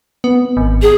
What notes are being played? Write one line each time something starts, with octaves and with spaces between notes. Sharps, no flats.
B3
G#1
G#4